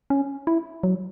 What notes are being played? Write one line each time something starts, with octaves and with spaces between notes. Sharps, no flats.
C#4
E4
F#3